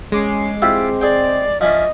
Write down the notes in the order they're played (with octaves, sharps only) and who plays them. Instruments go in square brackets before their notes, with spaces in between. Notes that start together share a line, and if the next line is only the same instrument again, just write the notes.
[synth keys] G#3 D6 C7 [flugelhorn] C#4
[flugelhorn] C4 [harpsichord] E4 F4 G4
[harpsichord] G#4 G5 [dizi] D5
[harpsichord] F3 C#4 D4 [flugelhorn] D#5 [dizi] E5